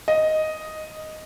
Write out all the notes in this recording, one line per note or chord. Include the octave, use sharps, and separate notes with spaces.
D#5